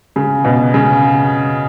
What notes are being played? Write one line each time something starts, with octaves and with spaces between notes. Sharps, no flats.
C#3
B2
C#3